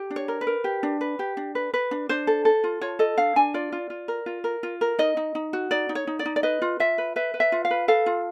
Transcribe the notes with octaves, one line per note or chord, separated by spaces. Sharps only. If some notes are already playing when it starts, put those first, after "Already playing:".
Already playing: G4
D4
C#5
A#4
B4
A#4
G4
D4
B4
G4
D4
B4
B4
D4
D4 C5
A4
A4
F4
F4 C#5
A4 D#5
D4 F5
D4 G#5
F4 D5
F4
F4
A#4
F4
A#4
F4
A#4
D#4 D#5
D#4
D#4
F#4
D#4 D5
D#4
C#5
D#4
D5
D#4
D5
B4 D#5
F4
F4 E5
B4
B4 E5
B4
E5
F4
F5
B4
A4 F5
F4